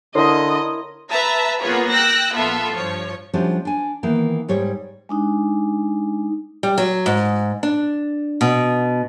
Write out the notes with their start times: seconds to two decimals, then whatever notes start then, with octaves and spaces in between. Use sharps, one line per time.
0.15 D3 E4 A#4 C#5 D#5 C6
1.10 B4 E5 A5 A#5
1.60 A#3 B3 F4 G#4 C#5
1.89 G5 E6 F#6 A#6
2.33 A#1 B3 F4 A4 E5
2.74 G2 F3 C#5
3.34 F3 G3 A3 C#4 D4 F#4
3.65 D4 G#5
4.03 D#3 E3 A#3 B3
4.49 G#2 G3 C#5
5.09 G#3 D4 D#4
6.63 G3
6.78 F#3
7.06 G#2
7.63 D4
8.41 B2